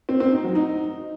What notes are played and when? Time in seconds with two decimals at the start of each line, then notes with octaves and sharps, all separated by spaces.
0.09 C4
0.20 C4
0.32 D#4
0.44 F#3
0.55 D#4